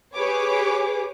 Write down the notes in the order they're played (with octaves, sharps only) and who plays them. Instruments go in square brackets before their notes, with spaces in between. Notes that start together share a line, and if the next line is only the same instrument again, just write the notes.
[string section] G4 G#4 B4 C#5 D6